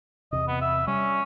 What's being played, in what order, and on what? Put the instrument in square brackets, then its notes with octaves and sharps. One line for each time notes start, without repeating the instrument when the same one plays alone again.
[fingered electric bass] E2 C3 [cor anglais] D#5
[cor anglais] B3
E5
[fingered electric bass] G3 [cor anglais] C#4